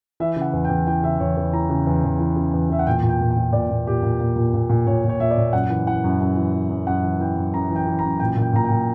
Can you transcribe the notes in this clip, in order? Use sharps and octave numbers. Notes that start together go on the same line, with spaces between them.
E3 E5
C#3
F#5
E2
G5
E2
E3 G5
C#3 E5
E2 C#5
E2 B4
E3 A#5
C#3
E2
E2
E3
C#3
E2
E2 E5
F#5
A#2 G5
A#2
G5
A#2
G5
A#2
A#2 D5
A#2
A#2 G4
A#2
A#2
A#2
A#2
A#2
A#2 C#5
A#2
C#5
A#2 E5
D5
A#2
F#2 F#5
E3
E3 F#5
F#2
F#2
E3
E3
F#2
F#2 F#5
E3
E3 G5
F#2
F#2 A#5
E3
G5
E3
A#5
F#2
A#2 G5
A#2
G5
A#2 A#5
G5
A#2